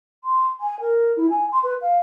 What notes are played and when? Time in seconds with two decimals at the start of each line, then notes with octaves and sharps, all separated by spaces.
0.24 C6
0.60 G#5
0.80 A#4
1.17 E4
1.30 G#5
1.52 C6
1.63 B4
1.81 F5